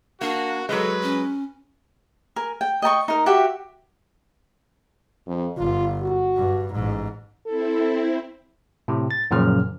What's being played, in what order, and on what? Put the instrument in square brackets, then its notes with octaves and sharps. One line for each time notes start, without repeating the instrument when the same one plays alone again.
[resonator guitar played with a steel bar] A#3 [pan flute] D4 [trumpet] F#4
[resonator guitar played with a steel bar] F#3 G#3 [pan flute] A4 [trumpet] B4
[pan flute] C#4
[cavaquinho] A#4 G#5
G5
D#5 G5 A#5 C#6
D#4 A#4
F#4 G4 E5 F#5
[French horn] F2
[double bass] G1 [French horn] F4
[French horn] F#4
[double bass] G2
A1 G#2
[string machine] C4 E4 [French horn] A4
[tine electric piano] A2 C3
A6
F#2 A#2 C#3 F3 F6